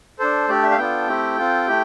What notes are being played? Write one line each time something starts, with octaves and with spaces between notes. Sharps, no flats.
D4 A4 C5
A3 D4 G4 D5
E5
F5
B3 D4 F4 A4 G5
A3 C4 E4 G4
C4 F4 A4
A3 E4 G4